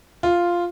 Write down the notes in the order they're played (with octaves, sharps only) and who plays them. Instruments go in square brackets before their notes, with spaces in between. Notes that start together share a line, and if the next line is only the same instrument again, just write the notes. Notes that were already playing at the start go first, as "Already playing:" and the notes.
[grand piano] F4